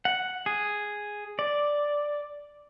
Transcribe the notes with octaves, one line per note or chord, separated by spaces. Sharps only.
F#5
G#4
D5